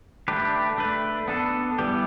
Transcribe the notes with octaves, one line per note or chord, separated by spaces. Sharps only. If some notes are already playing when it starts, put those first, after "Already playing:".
A3 D4 G4 B4
A3 D4 B4
B3 D4 A4
E3 G3 B3 G4